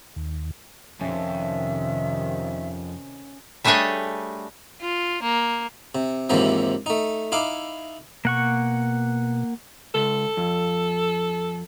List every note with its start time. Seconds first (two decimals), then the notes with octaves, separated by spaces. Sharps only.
0.16 D#2
1.01 F2 C3 D#3 C#4 E5
3.64 G3 A3 D4 G#4 C#5 D#5
4.81 F4
5.23 A#3
5.95 C3
6.30 D#2 G#2 C3 E3 F3
6.86 A3 D#4
7.32 D#4 E4 F5 D6
8.25 B2 A#3 F#5 C#6
9.95 C#2 A4
10.37 F2